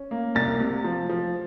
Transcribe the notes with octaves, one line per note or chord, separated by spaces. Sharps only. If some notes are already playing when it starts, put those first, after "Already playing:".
Already playing: C#4
A#3
C2 A6
C3
F3
F3